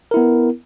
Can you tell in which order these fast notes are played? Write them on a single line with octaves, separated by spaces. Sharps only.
A#4 E4 B3